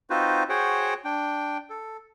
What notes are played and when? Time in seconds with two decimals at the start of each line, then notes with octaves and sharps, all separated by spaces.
0.10 C4 D#4 F4 F#4 B4 C5
0.49 F#4 G#4 C5 C#5 F#5 G5
1.05 D4 G5
1.70 A4